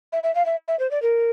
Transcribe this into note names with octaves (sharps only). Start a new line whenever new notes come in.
E5
E5
F5
E5
E5
C5
D5
A#4